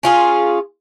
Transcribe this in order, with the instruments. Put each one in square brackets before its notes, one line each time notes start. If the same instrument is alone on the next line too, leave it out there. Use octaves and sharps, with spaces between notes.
[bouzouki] C#4 F4 G#4